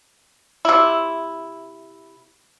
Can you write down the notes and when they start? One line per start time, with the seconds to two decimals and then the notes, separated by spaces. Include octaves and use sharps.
0.65 C3 E4